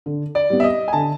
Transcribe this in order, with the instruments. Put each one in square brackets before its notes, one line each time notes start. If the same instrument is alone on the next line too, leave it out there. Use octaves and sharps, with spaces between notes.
[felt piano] D3
[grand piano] D5
[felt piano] G3 B3
[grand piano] E5
D#5
G#5
[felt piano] D3 [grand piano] A5